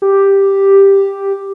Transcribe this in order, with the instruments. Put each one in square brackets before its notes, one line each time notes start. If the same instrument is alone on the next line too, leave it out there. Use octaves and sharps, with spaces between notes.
[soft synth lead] G4